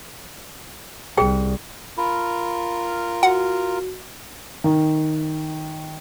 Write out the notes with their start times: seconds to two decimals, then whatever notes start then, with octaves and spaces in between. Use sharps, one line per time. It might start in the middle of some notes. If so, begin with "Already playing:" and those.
1.17 C2 G#4 G5
1.98 F4 A#4 B5
3.23 F#4 F#5
4.64 D#3